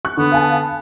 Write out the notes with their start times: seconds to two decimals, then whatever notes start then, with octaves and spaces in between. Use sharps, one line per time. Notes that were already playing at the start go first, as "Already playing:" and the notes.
0.05 C#6 F#6
0.17 D3 B3
0.32 F5 G#5 A5